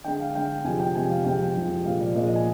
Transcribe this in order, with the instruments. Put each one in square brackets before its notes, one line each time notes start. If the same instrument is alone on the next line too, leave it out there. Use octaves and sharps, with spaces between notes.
[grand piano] D3 G5
G#3
F5
D3 G#3 G5
C3 F3 G#3 G#5
G5
C3 F3 G#3 G#5
F5
C3 F3 G#3 G5
C3 F3 G#3
A#2 F3 G#3 F5
D5
A#2 F3 G#3 D#5
D#5
G#5